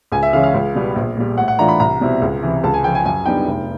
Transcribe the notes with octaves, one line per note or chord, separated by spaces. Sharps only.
C#2 G#5
E5
C#3 E3 G#3 C#4 F5
F5
C#2
B2 G3 B3
A#1
A#2 G3
A2 F#5
F#5
E3 A3 D4 F4 A#5
B5
C2 A#5
B2 G3 C4 E4
C#2
C3 E3
C#2 A5
G#5
C#3 F3 G5
G#5
F#2 G#5
D3 G3 B3 D#4 G5
F1